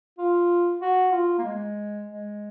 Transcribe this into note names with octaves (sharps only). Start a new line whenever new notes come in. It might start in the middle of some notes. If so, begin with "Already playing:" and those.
F4
F#4
F4
A#3
G#3
G#3